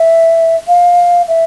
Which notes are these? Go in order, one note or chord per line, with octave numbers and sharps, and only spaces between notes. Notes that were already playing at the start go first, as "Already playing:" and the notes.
Already playing: E5
F5
E5